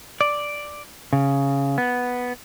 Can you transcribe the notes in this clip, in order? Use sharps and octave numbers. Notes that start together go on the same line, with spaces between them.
D5
C#3
B3